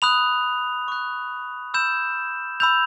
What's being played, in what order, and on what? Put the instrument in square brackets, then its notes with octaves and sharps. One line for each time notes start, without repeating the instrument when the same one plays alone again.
[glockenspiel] B5 D#6 F#6 F7
C#6 F#6
B5 E6 G6 E7
B5 E6 G6 F7